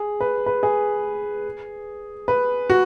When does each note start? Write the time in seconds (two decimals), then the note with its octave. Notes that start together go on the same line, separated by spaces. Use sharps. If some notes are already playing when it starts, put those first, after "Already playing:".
Already playing: G#4
0.21 B4
0.46 B4
0.63 G#4
2.28 B4
2.70 F#4